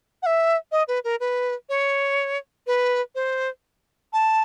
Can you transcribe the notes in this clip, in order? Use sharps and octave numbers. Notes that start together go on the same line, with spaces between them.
F#5
E5
D#5
B4
A#4
B4
C#5
B4
C5
A5